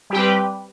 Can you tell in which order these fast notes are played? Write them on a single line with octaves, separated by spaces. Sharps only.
G3 G4 C4 B4